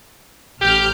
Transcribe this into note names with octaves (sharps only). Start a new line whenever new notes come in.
A1 G4 F6 G6